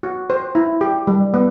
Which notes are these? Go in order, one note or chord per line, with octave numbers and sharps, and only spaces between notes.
F#4
C5
E4
G4
G3
B3